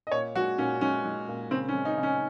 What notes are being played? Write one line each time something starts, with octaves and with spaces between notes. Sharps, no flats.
D#5
A#2 C#5
G#3 F#4
A#2 C#4
G#3 C#4
G#3
A#2
C#3 C4
C#4
G#3
D#4
C#3
C#4